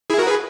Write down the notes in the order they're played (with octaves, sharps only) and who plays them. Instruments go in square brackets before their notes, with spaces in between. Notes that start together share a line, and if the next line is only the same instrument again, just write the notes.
[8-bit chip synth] E4 G#4
F#4 A#4
G#4 B4